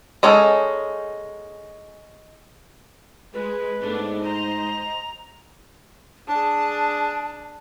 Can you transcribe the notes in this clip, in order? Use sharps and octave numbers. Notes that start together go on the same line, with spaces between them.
G#3 C#4 D#4 G#4 A4
G#3 B4
G#2 A3 B3 D4
C5 D#5 A#5
D4 G#4 A5